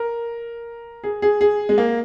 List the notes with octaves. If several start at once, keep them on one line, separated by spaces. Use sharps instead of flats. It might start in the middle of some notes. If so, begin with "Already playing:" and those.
Already playing: A#4
G#4
G#4
G#4
G#3
A#3